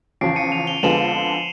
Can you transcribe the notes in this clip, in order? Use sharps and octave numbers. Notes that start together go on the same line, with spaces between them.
E2 C#3 F3 C7 D7
C#7 D#7
D#7 F7
F7 G7
F7
F2 D3 F3 G#3 B3 E7 F#7